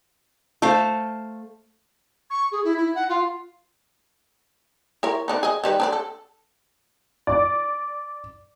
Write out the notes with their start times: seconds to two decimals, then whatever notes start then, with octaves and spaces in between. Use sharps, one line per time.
0.62 A3 A4 C5 F5
2.30 C#6
2.51 G#4
2.64 E4
2.77 E4
2.95 F#5
3.09 F4
5.03 E4 A#4 C#5
5.28 B3 D4 D#4
5.43 G#4 D#5
5.64 D#3 G3 B4
5.80 D4 B4 D5
5.93 A4
7.27 D5